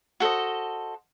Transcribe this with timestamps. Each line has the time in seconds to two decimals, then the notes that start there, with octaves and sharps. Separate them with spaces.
0.20 F#4 A4 C5 D#5